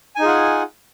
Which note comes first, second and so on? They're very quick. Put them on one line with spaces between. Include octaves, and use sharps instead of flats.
G#5 D#4 G#4 F4 F#5